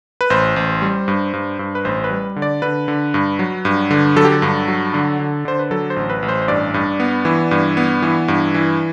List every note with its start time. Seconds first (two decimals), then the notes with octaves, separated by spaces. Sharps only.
0.21 B4
0.30 A1 C5
0.56 A1
0.82 G3
1.08 G2
1.33 G2
1.59 G2
1.75 B4
1.85 A1 C5
2.04 B4
2.11 G3
2.36 D3
2.42 D5
2.62 D3 B4
2.88 D3
3.14 G2
3.39 F#3
3.65 G2
3.91 D3
4.16 F#3 A4
4.25 G4
4.32 A4
4.42 G2
4.68 F#3
4.94 D3
5.19 D3
5.45 D3 C5
5.59 B4
5.71 F#3 A4
5.90 C5
5.96 A1
6.10 B4
6.23 A1
6.29 C5
6.42 C5
6.48 G2 D5
6.74 G2
7.00 B3
7.25 E3
7.51 G2
7.77 B3
8.02 E3
8.28 G2
8.54 E3